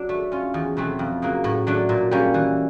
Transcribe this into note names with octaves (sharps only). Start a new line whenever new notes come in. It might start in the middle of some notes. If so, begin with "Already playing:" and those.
Already playing: F#3 D4
A3
C#4 F4
E2
B2 F#3 A3 C4
F2
C#3 F#3 A#3
A2
F#3 A3 D4
A#2
G3 A#3 C#4
E3